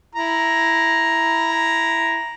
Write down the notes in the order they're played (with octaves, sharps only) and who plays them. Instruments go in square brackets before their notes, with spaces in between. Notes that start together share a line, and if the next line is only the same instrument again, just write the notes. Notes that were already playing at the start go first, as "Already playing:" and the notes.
[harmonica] E4 A#5